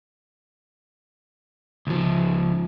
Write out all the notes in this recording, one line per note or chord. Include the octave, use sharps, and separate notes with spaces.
C#2 F3